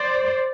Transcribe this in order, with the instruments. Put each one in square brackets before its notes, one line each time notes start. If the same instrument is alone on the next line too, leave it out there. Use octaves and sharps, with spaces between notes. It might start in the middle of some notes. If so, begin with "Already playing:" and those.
Already playing: [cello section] C5 D5